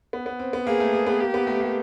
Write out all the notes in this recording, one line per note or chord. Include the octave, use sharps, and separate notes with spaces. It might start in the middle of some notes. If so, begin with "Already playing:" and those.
B3
B3
C4
B3
A#3 G#4
A3
A#3
B3
A#3 G4
B3
A3
A#3